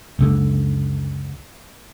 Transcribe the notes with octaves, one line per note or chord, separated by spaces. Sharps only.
F#1 C#2 D3